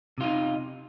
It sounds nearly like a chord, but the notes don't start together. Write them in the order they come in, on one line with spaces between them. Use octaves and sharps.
C3 F4 D#4